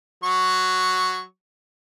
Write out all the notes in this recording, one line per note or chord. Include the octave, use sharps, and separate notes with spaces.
F#3 C#6